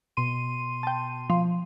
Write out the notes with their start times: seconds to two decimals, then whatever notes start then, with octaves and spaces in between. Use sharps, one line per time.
0.17 B2 C6 D#7
0.83 G5 A5
1.30 F3